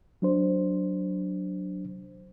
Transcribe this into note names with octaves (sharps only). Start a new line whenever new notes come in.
F#3 D4 C5